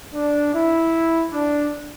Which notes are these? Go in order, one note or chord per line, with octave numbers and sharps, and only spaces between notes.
D4
E4
D4